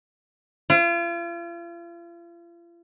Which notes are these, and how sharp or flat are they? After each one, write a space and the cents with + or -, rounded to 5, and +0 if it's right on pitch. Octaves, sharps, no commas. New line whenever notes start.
F4 -40